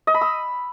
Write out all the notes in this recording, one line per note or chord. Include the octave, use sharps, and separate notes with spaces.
D#5
B5
E6